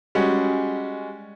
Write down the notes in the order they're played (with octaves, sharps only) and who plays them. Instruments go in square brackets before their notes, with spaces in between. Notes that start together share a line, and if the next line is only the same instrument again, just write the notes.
[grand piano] G3 G#3 C#4 F#4